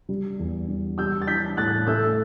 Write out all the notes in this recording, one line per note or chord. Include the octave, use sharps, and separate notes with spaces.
G3
E2
G3
G3 E6 G6
A6
E3 G6 B6
A2 F#6 A6
A3 E6 G6